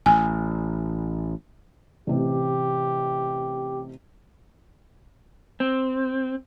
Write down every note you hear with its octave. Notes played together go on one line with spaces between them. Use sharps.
A1 G#5
A1 C3 G4
C4